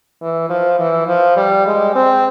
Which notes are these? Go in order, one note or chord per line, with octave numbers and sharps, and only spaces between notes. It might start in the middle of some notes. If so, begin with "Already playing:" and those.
E3
F3
E3
F3
G3
G#3
C4